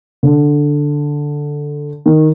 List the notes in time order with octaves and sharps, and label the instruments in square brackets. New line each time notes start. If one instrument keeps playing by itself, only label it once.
[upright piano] D3
D#3